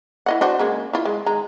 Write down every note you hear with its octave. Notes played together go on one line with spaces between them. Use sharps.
E4 D#5 F#5
D4 F#4 C5
C#3 G#3 A#3
E4 F4
G#3
D#3 G#3 A#5